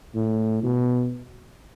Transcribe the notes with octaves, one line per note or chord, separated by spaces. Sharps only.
A2
B2